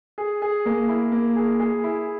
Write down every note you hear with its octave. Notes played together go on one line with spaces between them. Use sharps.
G#4
G#4
A#3
E4
A#3
G#4
G#4
E4